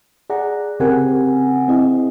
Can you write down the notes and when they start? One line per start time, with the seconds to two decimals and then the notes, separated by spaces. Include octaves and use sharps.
0.30 G#4 D5 F#5 A#5
0.80 C#3 C4 G4 A#4 F#5 G#5
1.68 C4 E4 G#4 D#5